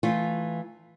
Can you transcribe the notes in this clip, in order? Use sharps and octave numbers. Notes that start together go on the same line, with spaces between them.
E3 A3 F4